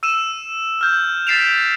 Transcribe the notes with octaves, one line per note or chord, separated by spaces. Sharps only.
E6 D#7 E7
F6 G6
A6 B6 C7 D7 E7 F7